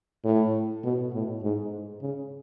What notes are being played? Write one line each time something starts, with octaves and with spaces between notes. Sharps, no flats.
A2
B2
A2
G#2
C#3